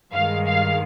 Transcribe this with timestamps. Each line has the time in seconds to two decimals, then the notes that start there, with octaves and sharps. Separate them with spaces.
0.13 G2 D#3 G#3 F5
0.47 F5